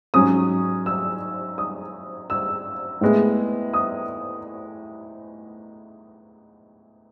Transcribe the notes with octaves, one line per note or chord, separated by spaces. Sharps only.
G#2 F#3 C#4 D#6
E6
D#6
E6
A2 G#3 B3
D#6